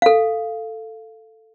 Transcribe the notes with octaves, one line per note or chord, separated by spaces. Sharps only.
A4 F5